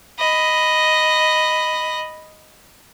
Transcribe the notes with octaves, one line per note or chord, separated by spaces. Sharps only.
D#5 B5